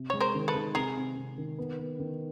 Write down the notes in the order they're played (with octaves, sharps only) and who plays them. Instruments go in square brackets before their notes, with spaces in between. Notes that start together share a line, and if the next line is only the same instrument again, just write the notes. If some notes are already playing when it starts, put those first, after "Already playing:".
Already playing: [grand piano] C3
[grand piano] G#3 [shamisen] C#5
[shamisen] A#4 C5
[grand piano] D#3
[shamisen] A4 B4
[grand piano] D#3
[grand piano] C3 [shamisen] G#4 A#4
[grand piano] C4
C3
D#3
B3
B3
D#3